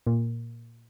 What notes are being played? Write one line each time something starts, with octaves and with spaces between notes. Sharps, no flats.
A#2